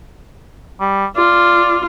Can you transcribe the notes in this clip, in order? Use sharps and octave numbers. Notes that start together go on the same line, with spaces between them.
G3
F4 D5